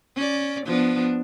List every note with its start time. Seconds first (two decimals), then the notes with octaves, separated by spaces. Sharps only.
0.16 C#4 D5
0.65 F3 B3 D4